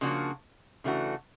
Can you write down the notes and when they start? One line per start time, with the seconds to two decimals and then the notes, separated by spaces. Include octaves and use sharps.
0.01 C#3 F3 A#3 D4 F#4
0.84 C#3 E3 A3 D4 F#4